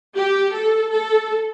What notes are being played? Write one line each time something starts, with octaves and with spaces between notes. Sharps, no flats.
G4
A4
A4